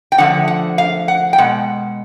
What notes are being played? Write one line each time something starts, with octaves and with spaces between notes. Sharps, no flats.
G5
D3 F3 A3 F#5
F#5
F5
F#5
G5
B2 G#3 F#5